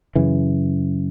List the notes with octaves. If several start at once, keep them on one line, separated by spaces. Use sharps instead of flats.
F#2 C#3 E3